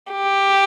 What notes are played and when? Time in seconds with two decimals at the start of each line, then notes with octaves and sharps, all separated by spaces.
0.12 G4